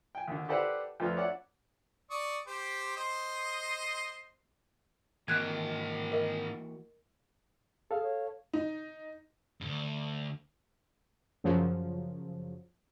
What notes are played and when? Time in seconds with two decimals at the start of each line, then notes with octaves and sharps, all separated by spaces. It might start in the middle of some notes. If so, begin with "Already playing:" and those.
0.15 G5 G#5
0.28 D#2 D3
0.49 G4 A4 B4 C5 D5 F#5
1.00 F2 F3 A3 B3 D4 F4
1.17 C#5 D5 E5 F#5
2.10 D5 C#6 D#6
2.47 G4 C5
2.97 C5 D#5 C6
5.28 G#2 D#3 E3 A#3 F#4 F#6 G#6
6.12 A#4 D#5
7.91 G#4 A4 F5
8.03 C#5
8.53 D#4
9.61 D2 G2
11.44 F#2 C#3 F3 F#3